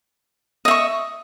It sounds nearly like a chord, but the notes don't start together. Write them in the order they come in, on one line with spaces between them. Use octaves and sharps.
D#5 E5 C#6